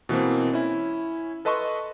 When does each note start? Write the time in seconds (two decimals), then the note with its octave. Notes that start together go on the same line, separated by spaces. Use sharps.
0.09 B2 E3 A#3 C4
0.53 C#4 E4
1.45 A4 B4 D#5 A5 C6 C#6